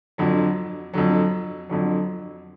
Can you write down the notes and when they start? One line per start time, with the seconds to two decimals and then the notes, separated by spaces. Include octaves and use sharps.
0.18 F2 D3 F#3
0.94 F2 D3 F#3
1.69 F2 D3 F#3